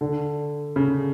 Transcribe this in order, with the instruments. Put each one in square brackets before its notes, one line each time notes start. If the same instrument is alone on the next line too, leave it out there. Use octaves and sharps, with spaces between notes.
[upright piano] D3
C#3